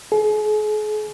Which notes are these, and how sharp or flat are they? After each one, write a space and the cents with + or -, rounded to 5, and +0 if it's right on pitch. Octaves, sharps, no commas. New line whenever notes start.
G#4 +40